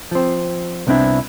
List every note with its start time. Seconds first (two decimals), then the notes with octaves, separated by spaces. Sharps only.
0.11 F3 C4
0.87 C2 B3 C4 D4 E4